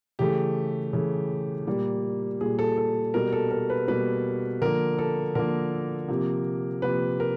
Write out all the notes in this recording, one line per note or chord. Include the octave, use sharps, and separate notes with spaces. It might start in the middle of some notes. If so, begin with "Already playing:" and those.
C#3 E3 A3 G4
C#3 E3 A3
A#2 G3 A#3
A#2 G3 A#3 G#4
A4
A4
B2 G3 A#3 A#4
A4
A#4
B4
B2 G3 A#3 B4
D3 F3 A#3 A#4
A4
D3 F3 A#3 A#4
C3 F3 A#3
C3 F3 A#3 B4
A#4